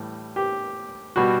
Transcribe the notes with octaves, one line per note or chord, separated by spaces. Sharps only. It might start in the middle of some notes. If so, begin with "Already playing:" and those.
Already playing: A2 E3 G3
G4
B2 G3 F#4